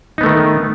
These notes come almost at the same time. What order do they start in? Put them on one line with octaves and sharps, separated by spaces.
D#4 B3 A3 D#3